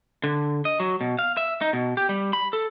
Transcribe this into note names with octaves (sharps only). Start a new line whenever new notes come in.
D3
D#5
F#3
B2
F5
E5
D#4
B2
G4
G3
B5
A4